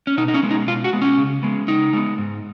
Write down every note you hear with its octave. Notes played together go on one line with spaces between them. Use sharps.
C#4
B2 D#4
D#4
C#4
G#3 B3
D#4
B2 F4
F#4
G#3 B3
C#4
C#3
G#3 B3
C#3 D#4
G#3 B3
G#2